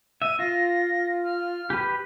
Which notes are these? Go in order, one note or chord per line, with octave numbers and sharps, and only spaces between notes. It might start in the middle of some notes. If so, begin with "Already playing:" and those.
E5 D#7
F4 A#6
F6
G4 B4